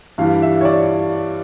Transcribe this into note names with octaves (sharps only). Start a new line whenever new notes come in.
G2 E3 G3 F5
E5
C#5
D5